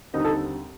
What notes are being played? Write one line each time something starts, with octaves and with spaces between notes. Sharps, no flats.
D#2 D3 G3 C4 D#4
A4